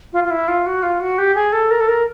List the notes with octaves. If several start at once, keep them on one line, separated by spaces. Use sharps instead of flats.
F4
F4
E4
F4
F#4
F4
F#4
G4
G#4
A4
A#4
A4
A#4